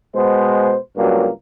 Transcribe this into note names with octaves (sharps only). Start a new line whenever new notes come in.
B2 G#3 C5
C#2 G2 F#3 A#3